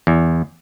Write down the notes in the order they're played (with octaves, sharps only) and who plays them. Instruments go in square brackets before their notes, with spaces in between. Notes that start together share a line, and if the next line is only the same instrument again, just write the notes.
[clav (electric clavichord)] E2